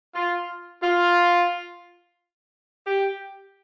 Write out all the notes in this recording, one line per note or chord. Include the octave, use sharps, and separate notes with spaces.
F4
F4
G4